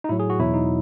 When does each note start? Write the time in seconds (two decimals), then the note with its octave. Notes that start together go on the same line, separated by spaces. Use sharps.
0.04 D#4
0.09 A2 F#3 E4
0.20 G#4
0.30 F#4
0.39 E2 B2 F#3 E4
0.54 D#4